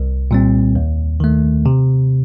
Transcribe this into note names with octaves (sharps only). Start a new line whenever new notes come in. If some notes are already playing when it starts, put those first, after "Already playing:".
Already playing: C2
A#2 G3 C4
D#2
D#3 A3
C3